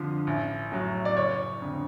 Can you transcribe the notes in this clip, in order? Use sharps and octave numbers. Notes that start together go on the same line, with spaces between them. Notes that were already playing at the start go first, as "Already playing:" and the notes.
Already playing: F2 D3 F3
A1
A2 F#3
D5
F#1 C#5
F2 D3